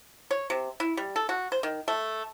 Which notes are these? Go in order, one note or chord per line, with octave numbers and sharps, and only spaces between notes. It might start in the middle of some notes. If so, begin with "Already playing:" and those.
C#5
C3
E4
G3
A4
F#4
C5
D#3
A3